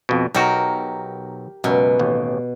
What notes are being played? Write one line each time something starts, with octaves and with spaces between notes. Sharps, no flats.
F2 B2
B1 D#4 F#4 G4 A#4
C#2 F#2 B2
A1 D#2